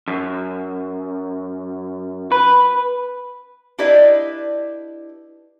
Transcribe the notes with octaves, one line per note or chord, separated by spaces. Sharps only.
F#2
B4
D4 E4 G4 B4 D5 D#5